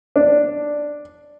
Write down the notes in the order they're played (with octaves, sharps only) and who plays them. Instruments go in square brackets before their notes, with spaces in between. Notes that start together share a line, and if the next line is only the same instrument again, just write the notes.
[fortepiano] D4